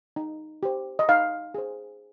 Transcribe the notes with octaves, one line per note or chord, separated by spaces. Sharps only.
D#4
G4 C5
D#5
D#4 F5
G#4 C5